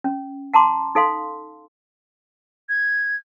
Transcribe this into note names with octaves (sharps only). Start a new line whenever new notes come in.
C#4
F#5 A5 A#5 C6 D6
D#4 A4 F5 C6
G#6